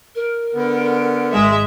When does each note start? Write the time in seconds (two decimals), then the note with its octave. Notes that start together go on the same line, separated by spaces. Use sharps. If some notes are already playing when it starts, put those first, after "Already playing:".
0.15 A#4
0.54 D3 B3
1.33 G#1 G#3 E5